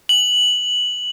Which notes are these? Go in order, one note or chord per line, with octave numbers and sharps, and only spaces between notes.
F#7